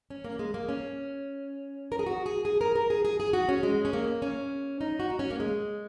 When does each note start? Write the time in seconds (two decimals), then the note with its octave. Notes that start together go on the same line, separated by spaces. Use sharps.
0.10 C#4
0.25 A#3
0.39 G#3
0.54 A#3
0.69 C#4
1.92 A#4
1.99 G#4
2.06 F#4
2.26 G#4
2.45 G#4
2.61 A#4
2.75 A#4
2.90 G#4
3.05 G#4
3.20 G#4
3.33 F#4
3.49 C#4
3.63 G#3
3.85 C#4
3.93 A#3
4.22 C#4
4.81 D#4
5.00 F#4
5.10 D#4
5.19 C#4
5.30 A#3
5.40 G#3